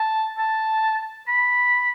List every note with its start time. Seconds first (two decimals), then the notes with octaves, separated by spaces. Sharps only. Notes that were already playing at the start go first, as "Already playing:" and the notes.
Already playing: A5
0.38 A5
1.28 B5